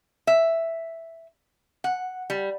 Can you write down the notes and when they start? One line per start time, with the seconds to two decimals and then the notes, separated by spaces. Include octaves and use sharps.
0.27 E5
1.84 F#5
2.30 G3